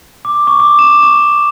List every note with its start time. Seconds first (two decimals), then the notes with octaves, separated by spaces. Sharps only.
0.25 D6
0.47 C#6
0.60 D6
0.79 E7
1.03 C#6